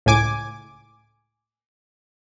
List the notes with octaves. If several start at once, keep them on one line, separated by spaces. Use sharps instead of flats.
C#2 A2 G#5 D6